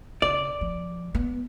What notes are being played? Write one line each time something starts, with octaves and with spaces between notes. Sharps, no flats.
C#3 D5
F3
B3